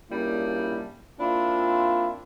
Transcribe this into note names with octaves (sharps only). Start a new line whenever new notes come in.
A#2 C#3 G3 A#3 D4 E4
A#3 C4 D4 E4 F4